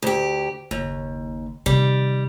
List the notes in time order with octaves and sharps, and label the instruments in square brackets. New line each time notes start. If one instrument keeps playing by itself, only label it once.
[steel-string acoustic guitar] D2 G4
[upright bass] F#1 [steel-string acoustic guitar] D#2
[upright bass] C3 D#3 [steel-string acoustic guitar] G3